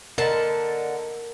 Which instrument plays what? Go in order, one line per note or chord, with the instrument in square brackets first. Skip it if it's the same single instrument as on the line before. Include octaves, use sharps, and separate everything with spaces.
[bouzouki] D3 A5 [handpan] A#4 [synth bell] D5 D#5